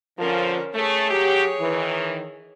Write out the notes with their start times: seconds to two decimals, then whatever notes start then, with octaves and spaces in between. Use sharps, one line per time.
0.19 D3 F3 C#4 A#4
0.75 A3 G#4 C#5
1.11 F#3 G4
1.59 D#3 E3